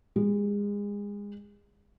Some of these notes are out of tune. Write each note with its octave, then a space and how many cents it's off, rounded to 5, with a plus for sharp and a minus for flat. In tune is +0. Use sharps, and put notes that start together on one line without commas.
G#3 -30